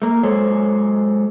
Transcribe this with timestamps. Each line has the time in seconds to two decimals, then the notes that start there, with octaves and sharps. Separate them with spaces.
0.02 A3 A#3
0.23 F#3 G#3 A4 C5 C#5